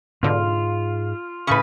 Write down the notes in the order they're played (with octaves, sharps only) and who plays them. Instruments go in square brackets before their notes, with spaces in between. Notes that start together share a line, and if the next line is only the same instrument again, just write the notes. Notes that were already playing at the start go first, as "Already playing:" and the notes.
[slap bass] G#2 [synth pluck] B2 D3 [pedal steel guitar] F4
[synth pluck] A2 C#6 [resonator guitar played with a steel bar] C#3 B4